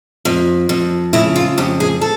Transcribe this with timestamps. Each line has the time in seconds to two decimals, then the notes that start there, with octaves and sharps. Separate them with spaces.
0.25 F2
0.69 F2
1.13 C#3 E4
1.36 F4
1.58 F2 G4
1.80 G#4
2.01 A4